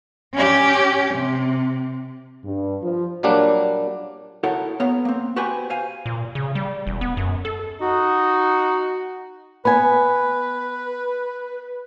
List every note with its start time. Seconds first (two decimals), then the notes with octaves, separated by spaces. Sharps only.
0.34 C#4 G4
1.14 C3
2.45 G2
2.83 F3
3.23 A#2 F#3 G3 A#3 D4
4.43 E4 F#4 A4 A#4 C#5 F#5
4.80 B3 C#5 F5 A#5
5.05 A#3 C4
5.36 F#4 G4 B4 C5 G5 G#5
5.70 C5 F5 G#5
6.06 A#2
6.35 C#3
6.55 G3
6.87 E1
7.01 B3
7.17 F#2
7.45 A4
7.81 D#4 F#4
9.65 B3 B4 G#5 B5